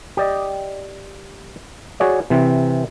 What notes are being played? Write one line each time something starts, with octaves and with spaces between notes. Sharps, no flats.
G4 D5 D#5
F#4 G#4 C#5 D5
C3 E3 C4